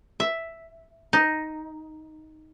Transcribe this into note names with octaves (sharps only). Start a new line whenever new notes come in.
E5
D#4